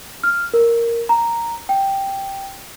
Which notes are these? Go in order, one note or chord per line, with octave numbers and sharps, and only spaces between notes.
F6
A#4
A#5
G5